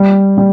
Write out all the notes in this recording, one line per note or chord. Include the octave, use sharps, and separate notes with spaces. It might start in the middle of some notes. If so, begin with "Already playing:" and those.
Already playing: G3
G3